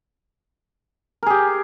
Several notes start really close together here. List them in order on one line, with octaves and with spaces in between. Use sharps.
A#4 G#4 G4